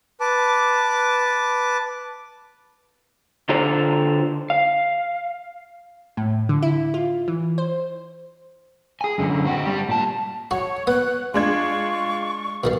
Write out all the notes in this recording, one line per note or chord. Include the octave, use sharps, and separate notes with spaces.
B4 A5 D6
D3 F4 A4 C5 D5 A#5
F5
A2
D3
E4
F4
E3
C5
G#4 G#5
F#2 D3
C4 F#4
G2 G3
A#2 A5
F#4 C#5 C#6
B3 F#6
G#3 D4 F4 C#6 G#6
B2 D#3 G3 F5